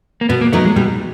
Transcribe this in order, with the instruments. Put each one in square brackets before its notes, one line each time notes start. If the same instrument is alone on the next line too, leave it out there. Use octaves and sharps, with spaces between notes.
[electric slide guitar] A#3
[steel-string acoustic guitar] B2 [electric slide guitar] B3
[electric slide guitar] A#3
[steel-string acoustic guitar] F#3 B3 D#4 [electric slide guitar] A3
[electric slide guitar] G#3
[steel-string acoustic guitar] B2 [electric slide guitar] G3